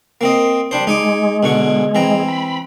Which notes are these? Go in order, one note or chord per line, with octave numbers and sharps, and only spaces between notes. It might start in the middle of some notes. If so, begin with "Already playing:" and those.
A#3 C4 D#5
G3 D4 C5
G#3 D#4 G#5 D6
B2 D3 C#6
E3 C4 A#5
B5